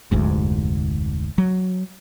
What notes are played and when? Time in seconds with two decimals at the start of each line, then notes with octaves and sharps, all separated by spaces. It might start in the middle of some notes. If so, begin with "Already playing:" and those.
0.11 F1 D2 G#2
1.38 F#3